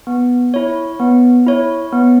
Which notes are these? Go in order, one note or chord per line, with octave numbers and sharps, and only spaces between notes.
B3
E4 C#5
B3
E4 C#5
B3